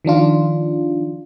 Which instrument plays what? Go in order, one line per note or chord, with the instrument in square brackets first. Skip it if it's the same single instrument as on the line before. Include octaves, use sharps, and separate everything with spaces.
[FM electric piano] D#3 F3 D4 F4